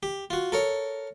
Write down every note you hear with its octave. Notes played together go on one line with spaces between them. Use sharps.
G4
F4 F#4
A4 A#4 C#5